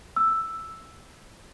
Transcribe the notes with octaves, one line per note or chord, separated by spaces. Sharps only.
E6